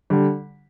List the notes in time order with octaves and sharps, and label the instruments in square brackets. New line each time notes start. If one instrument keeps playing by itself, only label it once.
[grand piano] D3 G3